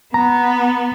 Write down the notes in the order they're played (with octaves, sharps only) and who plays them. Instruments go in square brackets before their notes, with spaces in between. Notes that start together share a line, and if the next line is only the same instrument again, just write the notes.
[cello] B3 [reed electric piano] A#5